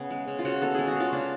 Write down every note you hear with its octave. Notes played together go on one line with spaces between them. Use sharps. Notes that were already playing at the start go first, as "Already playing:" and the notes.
Already playing: C#3 B3 G#4
G#3
C#3
F4
C#3 F#4
B3 A4
G#3 G#4
F#4
C#3 F4
C#3 D4